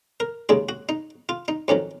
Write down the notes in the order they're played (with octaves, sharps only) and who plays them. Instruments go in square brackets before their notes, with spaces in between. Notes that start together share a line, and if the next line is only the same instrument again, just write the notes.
[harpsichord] A#4
D#2 C#3 G#3 G#4
F#4
D#4
F4
D#4
F2 D#3 F#3 C#4